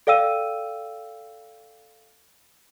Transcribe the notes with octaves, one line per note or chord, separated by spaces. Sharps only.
A4 D5 F5 G5 E6 D#7